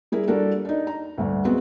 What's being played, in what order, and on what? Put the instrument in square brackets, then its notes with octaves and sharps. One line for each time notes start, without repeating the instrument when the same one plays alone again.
[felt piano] G3 E4 G#4 A#4
G3 D4 F#4 A4 A#4
D4 D#4
A#5
D2 G2 D3
G#3 B3 C4 F#4